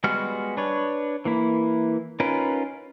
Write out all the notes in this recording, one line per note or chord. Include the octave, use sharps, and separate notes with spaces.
G3 G#3 B3 F#4 F6
D4 B4 C#5
E3 A#3 E4
C#4 D#4 F4 A#4 B4